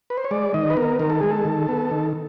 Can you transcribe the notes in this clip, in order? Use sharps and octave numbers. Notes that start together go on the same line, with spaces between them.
B4
C5
C#5
G#3 D5
D#3 D#5
B4
B3 A#4
D#3 A#4
A4
G#3 G#4
A4
D#3
B3
D#3